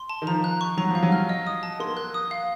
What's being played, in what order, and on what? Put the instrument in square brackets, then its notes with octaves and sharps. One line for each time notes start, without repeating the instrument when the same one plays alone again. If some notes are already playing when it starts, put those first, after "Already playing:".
Already playing: [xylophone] C6
A5
[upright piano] D#3
[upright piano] F3 [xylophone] A#5
[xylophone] F#6
C#6
[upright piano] F#3 [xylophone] A#5
[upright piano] F3
[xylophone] F5
[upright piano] F#3
[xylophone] F6
D#5
D#6
A5
[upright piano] A#3 [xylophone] C6
[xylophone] F#6
D#6
F5